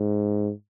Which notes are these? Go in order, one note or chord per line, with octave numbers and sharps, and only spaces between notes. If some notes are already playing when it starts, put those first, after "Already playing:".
Already playing: G#2